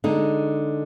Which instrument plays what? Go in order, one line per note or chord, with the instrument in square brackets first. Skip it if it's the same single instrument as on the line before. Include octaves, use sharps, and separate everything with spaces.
[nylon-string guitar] D3 G#3 D#4